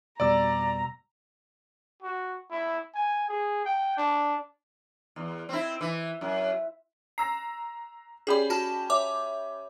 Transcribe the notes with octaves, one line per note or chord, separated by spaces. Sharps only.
F2 B2 G3 D5 A#5 E6
F#4
E4
G#5
G#4
G5
D4
E2
C4 E4
E3
F#2
A#5 E6 A#6 C7
C#4 G4 G#4 D5 B5
F#4 A5 F6
C#5 E5 D6